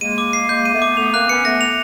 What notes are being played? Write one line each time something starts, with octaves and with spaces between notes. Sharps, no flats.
G#3 A#3 D#7
D6
C7
G#3 A#3 G6
D#7
A3 B3
D6
A3 B3 F7
A#3 C4 F#6
B3 C#4 C#7
A3 B3 A#6
F7